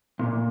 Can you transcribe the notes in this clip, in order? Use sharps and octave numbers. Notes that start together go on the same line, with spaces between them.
A#2